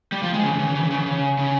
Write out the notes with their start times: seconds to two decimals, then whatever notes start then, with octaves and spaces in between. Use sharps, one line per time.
0.12 G3
0.22 F3
0.33 G#3
0.43 C#3
0.51 E3
0.59 C#3
0.66 E3
0.75 C#3
0.83 E3
0.90 C#3
0.98 E3
1.06 C#3
1.39 C#3